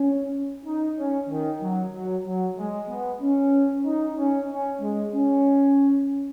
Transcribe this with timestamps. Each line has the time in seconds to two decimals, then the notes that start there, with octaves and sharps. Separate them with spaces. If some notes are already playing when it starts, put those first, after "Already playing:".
Already playing: C#4
0.66 D#4
0.97 C#4
1.29 D#3
1.62 F#3
1.94 F#3
2.25 F#3
2.57 G#3
2.89 B3
3.22 C#4
3.85 D#4
4.17 C#4
4.50 C#4
4.81 G#3
5.13 C#4